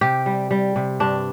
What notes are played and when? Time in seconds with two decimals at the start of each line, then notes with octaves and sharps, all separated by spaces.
0.01 C3 G4
0.26 G3
0.51 G3
0.76 C3
1.00 G2 D4